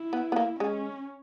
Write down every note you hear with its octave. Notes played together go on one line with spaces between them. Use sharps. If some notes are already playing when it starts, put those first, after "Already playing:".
Already playing: E4
B3
B3
A#3
G#3 C#4